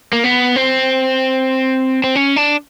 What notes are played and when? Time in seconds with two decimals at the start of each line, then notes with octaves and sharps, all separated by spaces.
0.13 A#3
0.24 B3
0.56 C4
2.04 C4
2.15 C#4
2.36 D4